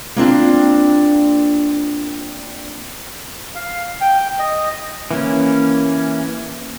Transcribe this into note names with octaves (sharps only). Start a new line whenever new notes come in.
A#3 C4 D4 F4
F5
G5
D#5
E3 A#3 C#4